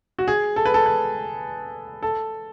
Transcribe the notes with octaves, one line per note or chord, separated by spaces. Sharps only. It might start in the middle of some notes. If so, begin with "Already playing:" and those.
F#4
G#4
A4
B4
A4
B4
A4